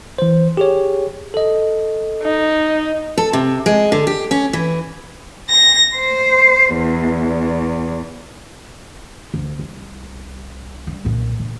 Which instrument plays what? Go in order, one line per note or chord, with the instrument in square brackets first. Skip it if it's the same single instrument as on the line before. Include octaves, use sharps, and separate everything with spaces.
[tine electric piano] E3 C5
G4 G#4 C#5
A4 D#5
[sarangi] D#4
[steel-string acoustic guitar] A4
C3
G#3
D3
G4
C#4
E3
[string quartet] A#6
C5
E2
[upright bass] D2
C2
G3 A3
B1 A#2
A#2